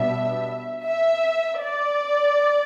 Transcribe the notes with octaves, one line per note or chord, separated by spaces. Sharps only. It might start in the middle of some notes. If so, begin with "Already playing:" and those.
Already playing: B2 G3 B3 D4 E5
E5
D5